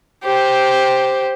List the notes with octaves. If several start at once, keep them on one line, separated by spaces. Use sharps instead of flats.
G4 C5